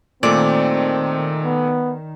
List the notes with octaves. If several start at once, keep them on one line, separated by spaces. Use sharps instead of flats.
A#2 D#3 A3 C4 D5
B3